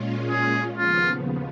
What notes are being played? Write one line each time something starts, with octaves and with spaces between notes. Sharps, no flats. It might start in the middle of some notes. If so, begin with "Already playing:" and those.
Already playing: A#2 G#3 C#4 F4
G#4
D#2 C#3 F3 B3 F4